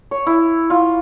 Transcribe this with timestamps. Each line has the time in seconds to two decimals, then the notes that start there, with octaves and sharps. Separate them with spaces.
0.11 C#5
0.27 E4
0.70 F4